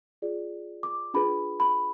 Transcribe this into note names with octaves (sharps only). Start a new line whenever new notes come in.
F4 G#4 D5
D6
D4 F4 G#4 B4 B5
B5